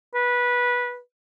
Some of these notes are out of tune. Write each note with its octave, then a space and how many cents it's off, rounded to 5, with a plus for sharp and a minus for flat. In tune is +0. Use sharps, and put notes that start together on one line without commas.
B4 -15